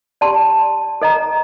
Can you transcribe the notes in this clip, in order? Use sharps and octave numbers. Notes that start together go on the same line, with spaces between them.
G4 D5 A5 C6
A4 D#5 A#5